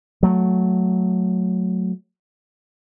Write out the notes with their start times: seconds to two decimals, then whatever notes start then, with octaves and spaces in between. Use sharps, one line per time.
0.23 F#3 A3